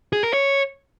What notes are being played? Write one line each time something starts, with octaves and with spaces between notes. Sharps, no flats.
G#4
A#4
C#5